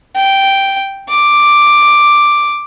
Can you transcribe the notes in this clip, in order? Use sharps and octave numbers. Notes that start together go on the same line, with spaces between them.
G5
D6